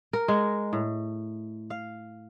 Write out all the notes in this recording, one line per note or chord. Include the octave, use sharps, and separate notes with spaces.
A#4
G#3
A2
F5